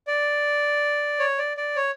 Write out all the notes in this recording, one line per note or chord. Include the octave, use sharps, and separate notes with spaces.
D5
C#5
D5
D5
C#5